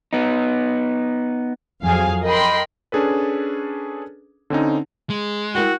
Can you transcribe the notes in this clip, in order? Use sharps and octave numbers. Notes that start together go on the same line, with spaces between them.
B3 D#4
F2 F#3 G#4 F5 G#5
A#4 D#5 G5 B5 C6
C#4 D4 G#4 A4 B4
D3 C4 C#4 D#4
G#3
E4 F#4 A#4 G5